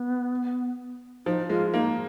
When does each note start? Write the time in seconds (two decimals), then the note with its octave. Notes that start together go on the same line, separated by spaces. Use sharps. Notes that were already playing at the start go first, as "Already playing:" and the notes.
Already playing: B3
1.26 F3 D#4
1.50 G#3 F4
1.73 A#3 D#4